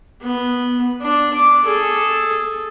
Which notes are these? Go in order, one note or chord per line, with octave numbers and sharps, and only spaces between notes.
B3
D4
D6
G#4 A4